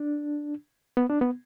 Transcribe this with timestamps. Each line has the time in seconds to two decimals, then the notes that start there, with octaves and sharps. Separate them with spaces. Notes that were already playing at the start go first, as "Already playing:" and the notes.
Already playing: D4
0.97 B3
1.10 D4
1.21 B3